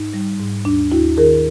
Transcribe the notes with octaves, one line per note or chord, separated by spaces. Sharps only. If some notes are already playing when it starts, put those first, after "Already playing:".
Already playing: G#2 D#4
G3
G#2
D#2 D4
D#2 E4 F#4
D#3 G#4 A#4